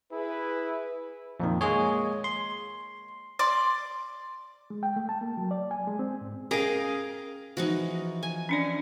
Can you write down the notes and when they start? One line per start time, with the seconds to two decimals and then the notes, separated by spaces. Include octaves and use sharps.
0.12 E4 G#4 B4
1.40 F2 A#2 D#3
1.61 G#3 A#3 G#4 C#5
2.24 C6
3.39 D5 C6 D6
4.70 G#3
4.83 G5
4.96 A3
5.09 A5
5.21 A#3
5.37 F#3
5.51 D5
5.71 G#5
5.87 G#3
5.99 C4
6.21 G#2
6.51 C#4 G#4 A#4 D#5 F5 G5
7.57 E3 F3 D#4 F#4
8.23 G#5
8.49 C#4 D4 D5